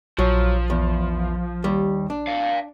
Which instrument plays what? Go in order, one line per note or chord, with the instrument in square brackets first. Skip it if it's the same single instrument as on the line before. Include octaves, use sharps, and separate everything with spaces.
[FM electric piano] A#1 [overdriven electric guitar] F3 [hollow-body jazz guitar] F#3
[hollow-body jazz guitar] E2
D#2 G3
D4
[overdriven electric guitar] D5 F5